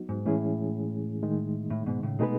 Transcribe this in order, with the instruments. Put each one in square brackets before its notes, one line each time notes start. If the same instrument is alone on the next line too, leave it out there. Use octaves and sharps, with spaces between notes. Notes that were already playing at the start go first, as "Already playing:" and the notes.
Already playing: [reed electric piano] F#3 B3 D#4 F#4
[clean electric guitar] G#2
[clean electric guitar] A2 [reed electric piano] E3 G#3 C#4 E4 G#4
[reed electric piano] D#3 G#3 D#4
[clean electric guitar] A2
G#2 B2
A2 C#3
[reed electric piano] B2 A3 D#4 G#4 B4 [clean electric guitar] G#3 B3